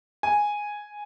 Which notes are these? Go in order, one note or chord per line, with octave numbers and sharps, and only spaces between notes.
G#5